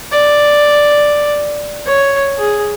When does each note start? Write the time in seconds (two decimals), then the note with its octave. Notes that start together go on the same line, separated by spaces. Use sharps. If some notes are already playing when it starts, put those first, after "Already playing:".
0.12 D5
1.86 C#5
2.38 G#4